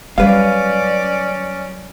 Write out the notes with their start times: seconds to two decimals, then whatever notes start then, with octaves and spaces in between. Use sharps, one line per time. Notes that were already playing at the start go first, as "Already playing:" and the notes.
0.18 F#3 G3 C#4 B4 D5 F5